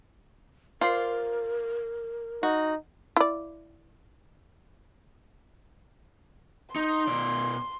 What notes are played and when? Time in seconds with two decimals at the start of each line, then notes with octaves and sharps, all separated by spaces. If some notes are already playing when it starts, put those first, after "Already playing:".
0.81 F4 A#4 C5 D5
2.43 D#4 F#4
3.17 E4 D5
6.76 D#4 C6
7.08 B2 D5